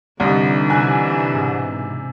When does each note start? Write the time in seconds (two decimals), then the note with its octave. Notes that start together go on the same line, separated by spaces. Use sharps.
0.20 C2 D3 E3 D4 D#4
0.69 C3 G#5 F#6
1.34 G#2 B2